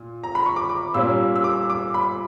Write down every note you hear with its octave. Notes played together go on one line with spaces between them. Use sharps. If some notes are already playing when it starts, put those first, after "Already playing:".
Already playing: A#2
A#5
B5
C#6
D6
D6
A#2 G3 A#3 C#4 E6
E6
D6
D6
B5